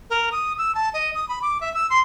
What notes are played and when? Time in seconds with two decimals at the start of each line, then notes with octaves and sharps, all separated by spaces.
0.10 A#4
0.32 D#6
0.58 E6
0.75 A5
0.94 D#5
1.15 D#6
1.29 B5
1.42 D6
1.61 E5
1.74 E6
1.90 C6